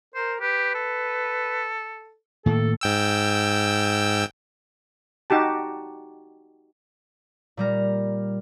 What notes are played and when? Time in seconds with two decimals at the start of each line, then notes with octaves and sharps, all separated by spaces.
0.15 A#4 C5
0.41 G4 B4
0.74 A4
2.46 A2 D#3 A#3 A4
2.81 G#2 G5 E6
5.30 D#4 F#4 G4 A5
7.57 A#2 G3 A#4